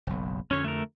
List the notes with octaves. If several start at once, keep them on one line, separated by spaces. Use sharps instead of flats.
F#1 B1
F2 D3 C#4 C#5
A3 A#4